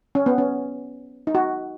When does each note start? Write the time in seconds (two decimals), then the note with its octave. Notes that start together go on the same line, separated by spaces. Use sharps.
0.15 C#4
0.26 B3
0.38 C#4
1.27 D#4
1.35 F#4